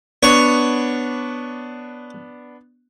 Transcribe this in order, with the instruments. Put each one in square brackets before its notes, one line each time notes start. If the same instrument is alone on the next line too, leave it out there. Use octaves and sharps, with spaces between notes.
[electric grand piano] B3 D4 [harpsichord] C#5